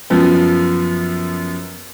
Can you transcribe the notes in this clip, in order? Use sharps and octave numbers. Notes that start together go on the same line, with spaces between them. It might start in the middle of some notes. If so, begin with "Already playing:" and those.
F#2 F3 B3